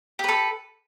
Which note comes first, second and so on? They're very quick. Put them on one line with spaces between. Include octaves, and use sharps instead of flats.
G4 B4 A4